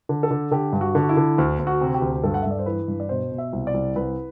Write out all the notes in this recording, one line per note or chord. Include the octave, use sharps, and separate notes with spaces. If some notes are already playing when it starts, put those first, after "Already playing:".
D3
A4
D3
D3 G4
G2
F#4
D3
F#4
E4
D3
D2
D2
F#4
C3
G4
D2
G2 A4
F#5
E5
G2
D5
C5
E3 B4
G2
D5
B2 C5
B2
E5
C2
D5
C2
C2 B4